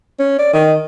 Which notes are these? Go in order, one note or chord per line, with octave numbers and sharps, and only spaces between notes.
C#4
D5
D#3